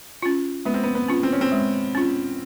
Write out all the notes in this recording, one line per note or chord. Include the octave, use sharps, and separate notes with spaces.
C#4 F4
G#3 B3
C4
B3
B3
C#4 F4
C4
C#4
C4
G#3
C#4 F4